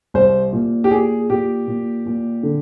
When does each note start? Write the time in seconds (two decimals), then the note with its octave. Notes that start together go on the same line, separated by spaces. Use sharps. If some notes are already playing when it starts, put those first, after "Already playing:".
0.14 C2 C5
0.53 A#2
0.84 G4
0.91 A#2 G#4
1.30 A#2 G4
1.68 A#2
2.06 A#2
2.43 D3